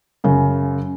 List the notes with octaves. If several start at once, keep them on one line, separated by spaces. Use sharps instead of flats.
F#2 C#3